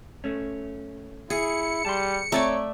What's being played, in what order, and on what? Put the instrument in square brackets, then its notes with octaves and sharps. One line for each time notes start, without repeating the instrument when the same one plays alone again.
[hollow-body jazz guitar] A3 C#4
[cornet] E4 [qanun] G#4 [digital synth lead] C#7
[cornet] G3 [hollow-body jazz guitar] A5 C6
[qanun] A3 D5 E5 [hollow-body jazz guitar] C4 A#5 [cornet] C#5